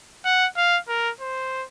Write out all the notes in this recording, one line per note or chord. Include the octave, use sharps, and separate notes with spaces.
F#5
F5
A#4
C5